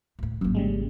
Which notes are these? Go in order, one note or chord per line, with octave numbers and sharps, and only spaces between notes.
D2 A2
G#1 F#2 A#3
C#3 G3 G#3